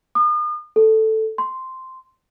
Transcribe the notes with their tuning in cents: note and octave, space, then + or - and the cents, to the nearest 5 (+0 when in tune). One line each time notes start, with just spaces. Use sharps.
D#6 -40
A4 +0
C6 -5